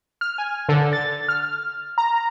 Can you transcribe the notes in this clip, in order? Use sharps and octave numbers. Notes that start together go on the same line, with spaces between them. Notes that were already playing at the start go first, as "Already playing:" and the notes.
F6
G#5
D3
A6
F6
A#5